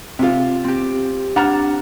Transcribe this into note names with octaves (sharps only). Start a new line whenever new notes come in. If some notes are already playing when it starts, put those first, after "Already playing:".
C3 F4
C4 G4
D4 F#5 A#5 F6